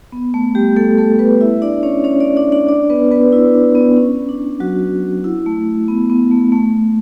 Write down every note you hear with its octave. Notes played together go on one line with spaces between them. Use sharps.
B3
A3
G3 G4
A3 A4
A3 A4
B3 B4
E4 E5
D4 D5
C#4 C#5
C#4 C#5
D4 D5
D4 D5
D4 D5
D4 D5
B3 B4
B3 B4
E4
D4
B3
C#4
D4
F#3 F#4
E4
A3
B3
B3
A3
A3